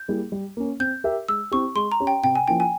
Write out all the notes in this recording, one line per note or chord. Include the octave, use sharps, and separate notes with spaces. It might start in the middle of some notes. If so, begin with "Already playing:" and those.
Already playing: G6
G3 A#3 E4 G#4
G3
A#3 C#4
C4 G6
G4 A#4 E5
G#3 E6
C4 E4 G4 C#6
G#3 C6
A#5
C#4 G4 C#5
G5
C3 G5
G#5
F3 A#3 C#4 E4 G5
G#5